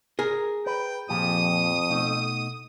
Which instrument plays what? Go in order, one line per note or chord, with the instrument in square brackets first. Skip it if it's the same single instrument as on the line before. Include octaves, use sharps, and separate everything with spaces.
[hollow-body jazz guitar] G#4 A#4
[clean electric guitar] B4 [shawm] G5
[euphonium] F2 [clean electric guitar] A#2 F3 G4 [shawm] D#6
[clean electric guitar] B2 A3 D#4